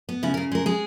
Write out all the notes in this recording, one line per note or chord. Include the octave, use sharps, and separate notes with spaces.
B3
C#3 E4
C#3 A#4
G#3 A#4
G#3 G#4